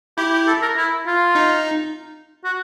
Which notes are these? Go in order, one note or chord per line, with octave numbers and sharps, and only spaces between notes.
E4 G4
G4
A4
A#4
E4
F4
D#4
F#4